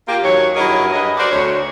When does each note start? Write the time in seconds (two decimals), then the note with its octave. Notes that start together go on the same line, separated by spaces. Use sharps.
0.08 A#3 F4 G4
0.23 D#2 F#3 C#5
0.56 G2 F#3 E4 G#4 A#4 D#5
0.93 G2 G#4 B4 D#5
1.17 F#4 A#4 C5 D5
1.31 D2 C#5